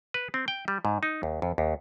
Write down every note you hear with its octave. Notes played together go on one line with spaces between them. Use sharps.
B4
C4
G5
G3
G#2
D#4
D#2
F2
D#2